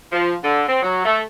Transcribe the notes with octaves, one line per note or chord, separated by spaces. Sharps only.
F3
D3
C4
F#3
A3